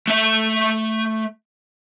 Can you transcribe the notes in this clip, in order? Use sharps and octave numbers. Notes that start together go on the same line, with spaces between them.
A3 E5